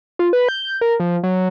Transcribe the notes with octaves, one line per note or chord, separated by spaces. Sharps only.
F4
B4
G6
A#4
F3
F#3